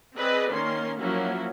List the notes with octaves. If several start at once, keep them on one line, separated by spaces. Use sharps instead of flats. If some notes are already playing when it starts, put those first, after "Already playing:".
C4 G#4 B4 D5 D#5
D#3 A#3 C#4 C6
F3 F#3 A#3 C#4 E4 F#4